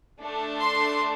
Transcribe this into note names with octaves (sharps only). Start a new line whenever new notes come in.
A3 D4 A4
C6